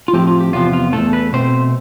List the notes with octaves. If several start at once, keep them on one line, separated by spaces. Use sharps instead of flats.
F4
A2 F3 C4 G4
F4
G4
E2 C3 F3 B3 F4
F4
E2 B2 A3 A4
B4
B2 A3 C4 C5